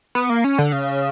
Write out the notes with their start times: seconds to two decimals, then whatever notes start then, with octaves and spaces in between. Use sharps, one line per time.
0.15 B3
0.30 A#3
0.44 C#4
0.58 D3
0.72 C#3